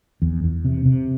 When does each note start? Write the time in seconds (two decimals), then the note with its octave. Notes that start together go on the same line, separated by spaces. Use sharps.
0.22 E2
0.44 E2
0.65 C3
0.86 C3